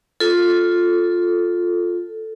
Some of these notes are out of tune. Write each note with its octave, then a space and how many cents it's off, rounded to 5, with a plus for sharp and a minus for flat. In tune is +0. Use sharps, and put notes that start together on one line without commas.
F4 +10 A4 +0